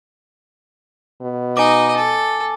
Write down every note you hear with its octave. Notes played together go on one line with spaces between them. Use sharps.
B2
D#4 D#5 G#5 D6
A4